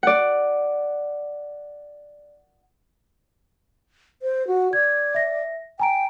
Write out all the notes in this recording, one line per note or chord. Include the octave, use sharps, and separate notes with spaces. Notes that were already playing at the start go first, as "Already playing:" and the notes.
D5 F#5
C5
F#4
D5 G#6
E5 A#6
G5 G#5 A#5 D7